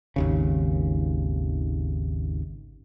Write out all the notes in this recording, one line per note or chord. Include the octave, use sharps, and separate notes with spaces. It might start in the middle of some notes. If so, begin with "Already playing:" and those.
G#1 D#2 C#3